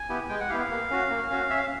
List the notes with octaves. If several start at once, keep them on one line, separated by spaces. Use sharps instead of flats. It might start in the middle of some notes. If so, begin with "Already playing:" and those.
Already playing: G#5
B3 E4 G4
G#3 G5
F#5
B3 E4 G4 F5
F5
A#3
C#4 F#4
A#3
C#4 F#4
C#4 E5
F5